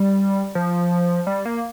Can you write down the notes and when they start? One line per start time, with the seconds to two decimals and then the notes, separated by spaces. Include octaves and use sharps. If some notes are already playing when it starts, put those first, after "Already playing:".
Already playing: G3
0.55 F3
1.27 G3
1.45 A#3